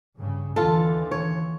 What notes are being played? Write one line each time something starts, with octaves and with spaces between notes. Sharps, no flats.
G2 C#3
D#2 D3 E3 F4 A4
C#5